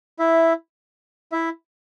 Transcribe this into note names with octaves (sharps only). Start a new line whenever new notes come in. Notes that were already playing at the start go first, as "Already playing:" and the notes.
E4 E5
E4 E5